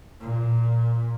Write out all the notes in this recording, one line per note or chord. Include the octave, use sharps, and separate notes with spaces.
A#2